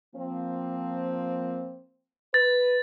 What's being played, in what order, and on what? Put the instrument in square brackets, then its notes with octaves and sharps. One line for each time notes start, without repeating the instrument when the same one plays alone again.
[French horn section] F3 A#3 C4
[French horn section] B4 [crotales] A6